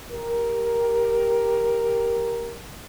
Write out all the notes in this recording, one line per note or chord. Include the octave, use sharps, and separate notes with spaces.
G4 A#4